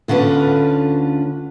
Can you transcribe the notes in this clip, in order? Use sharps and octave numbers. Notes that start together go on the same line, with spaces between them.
D2 D3 C#4 F4 B4